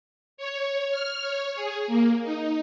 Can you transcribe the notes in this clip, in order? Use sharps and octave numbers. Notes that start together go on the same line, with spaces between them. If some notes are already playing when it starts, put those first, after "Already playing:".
C#5
F6
C#5
G#4
A#3
D#4